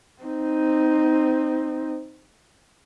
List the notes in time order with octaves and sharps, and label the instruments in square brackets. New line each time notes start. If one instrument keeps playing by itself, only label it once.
[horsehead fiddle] C4 D#4